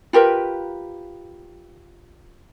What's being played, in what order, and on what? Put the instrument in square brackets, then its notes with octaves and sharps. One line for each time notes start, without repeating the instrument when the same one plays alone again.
[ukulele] F4 G4 A#4 B4